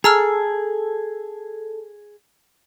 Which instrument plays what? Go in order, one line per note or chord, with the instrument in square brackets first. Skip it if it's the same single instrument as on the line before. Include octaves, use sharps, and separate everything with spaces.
[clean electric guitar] G#4 [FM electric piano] A4 [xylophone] A#5 E6 F6